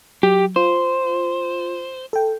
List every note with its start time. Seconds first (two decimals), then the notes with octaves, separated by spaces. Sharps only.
0.23 F#3 G4
0.56 F4 C5
2.13 A4 G5